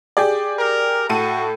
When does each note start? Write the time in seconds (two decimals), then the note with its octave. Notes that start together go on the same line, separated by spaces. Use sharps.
0.17 G4 G#4 D5
0.59 A#4
1.09 A2 F#4 A4 D#7